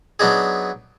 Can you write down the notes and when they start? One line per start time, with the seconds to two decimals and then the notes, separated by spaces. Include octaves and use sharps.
0.19 F#3 B3 D4 D#4 G#4